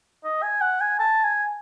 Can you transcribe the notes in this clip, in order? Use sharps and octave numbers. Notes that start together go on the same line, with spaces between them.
D#5
G#5
F#5
G#5
A5
G#5